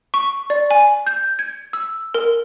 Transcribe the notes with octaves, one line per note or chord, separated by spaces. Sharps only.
C#6
D5
G#5
G6
G#6
E6
A#4